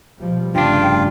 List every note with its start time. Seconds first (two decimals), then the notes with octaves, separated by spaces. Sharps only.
0.19 B2 F3 G3
0.55 F1 G2 C#3 A3 D4 F4 G5